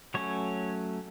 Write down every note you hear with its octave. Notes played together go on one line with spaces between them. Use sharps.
F#3 A3 C#4 C#5